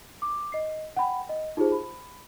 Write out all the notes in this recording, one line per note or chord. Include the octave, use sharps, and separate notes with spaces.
D6
D#5 C7
F#5 G5 B5
D#5
D#4 F4 G4 G#4 C5
B5